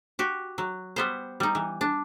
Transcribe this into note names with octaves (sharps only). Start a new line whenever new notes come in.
F#4 G4
F#3
G3 B3 C5
G3 D#4
E3
D4